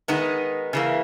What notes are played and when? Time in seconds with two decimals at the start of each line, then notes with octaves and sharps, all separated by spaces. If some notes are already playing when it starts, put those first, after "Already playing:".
0.08 D#3 G#3 B3 D#4
0.73 C#3 E3 A#3